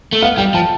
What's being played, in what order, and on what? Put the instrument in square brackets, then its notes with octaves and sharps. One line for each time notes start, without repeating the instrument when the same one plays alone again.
[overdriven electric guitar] A3
[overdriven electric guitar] B3 [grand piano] F5
[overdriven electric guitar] G3 [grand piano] G5
[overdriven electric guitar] F3 [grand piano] A5